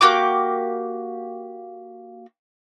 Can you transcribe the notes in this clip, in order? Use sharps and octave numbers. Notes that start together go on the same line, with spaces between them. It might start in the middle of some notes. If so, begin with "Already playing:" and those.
A#3 F#4 G4 D6